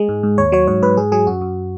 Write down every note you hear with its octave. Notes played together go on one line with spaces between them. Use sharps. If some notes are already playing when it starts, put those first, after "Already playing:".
Already playing: G#3 G#4
G#2
G#2
D#2 C#5
F#3 C#5
G#2 C#5
G#2 B4
G#2 G#4
F#3 G#4
F#2 F#4
F#2